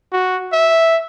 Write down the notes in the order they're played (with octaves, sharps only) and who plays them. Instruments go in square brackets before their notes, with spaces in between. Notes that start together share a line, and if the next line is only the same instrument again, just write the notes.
[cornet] F#4
E5